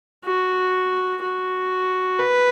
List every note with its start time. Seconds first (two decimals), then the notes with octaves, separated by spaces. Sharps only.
0.25 F#4
1.22 F#4
2.19 B4